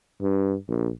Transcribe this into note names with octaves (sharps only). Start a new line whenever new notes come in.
G2
A#1